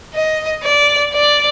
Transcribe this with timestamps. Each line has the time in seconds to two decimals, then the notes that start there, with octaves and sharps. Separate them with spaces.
0.14 D#5
0.63 D5
1.13 D5